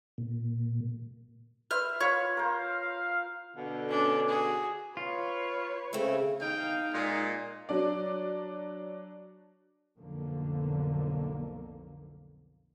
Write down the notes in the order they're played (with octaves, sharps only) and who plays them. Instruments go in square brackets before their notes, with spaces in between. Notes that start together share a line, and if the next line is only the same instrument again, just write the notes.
[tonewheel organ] A#2
[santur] B4 C5 E5 [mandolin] F6
[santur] F4 F5 B5 [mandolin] C#5
[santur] A#4 C5 [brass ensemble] F5
[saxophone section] B2 D3
[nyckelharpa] C#4 D4
F#4 G#4
[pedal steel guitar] F4 [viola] B4 C#5
[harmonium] C#3 [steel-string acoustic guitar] A3 C4
[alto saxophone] D#4 [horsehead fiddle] F5 [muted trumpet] G5
[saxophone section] A#2 [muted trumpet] G#3
[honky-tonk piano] F#3 D4 D5
[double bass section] B1 F2 D3 A#3